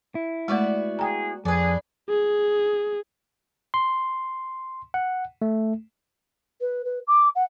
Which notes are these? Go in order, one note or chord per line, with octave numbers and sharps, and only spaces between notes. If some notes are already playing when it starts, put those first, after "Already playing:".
E4
G#3 A3 B3 F#4 D5
G#4 G5 A#5
F2 D4 G#4 B4
G#4
C6
F#5
A3
B4
B4
D6
F#5